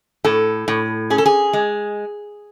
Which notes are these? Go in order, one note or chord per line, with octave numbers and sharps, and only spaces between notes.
A2 A4
A2
C#4 G#4
A4
G#4
G#3